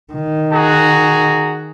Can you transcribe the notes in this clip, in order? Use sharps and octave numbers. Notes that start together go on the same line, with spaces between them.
D#3
F#4 G#4 A#5